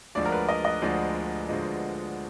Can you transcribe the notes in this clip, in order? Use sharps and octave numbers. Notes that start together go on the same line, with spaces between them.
D2 D3 F3 G#3 D5
A#4
B4
D#5
D#5
D2 D3 F3 G#3 D5
D2 D3 F3 G#3